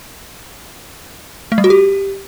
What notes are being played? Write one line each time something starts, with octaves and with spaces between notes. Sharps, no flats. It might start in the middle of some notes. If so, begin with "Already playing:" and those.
A3
G3
F#4
G4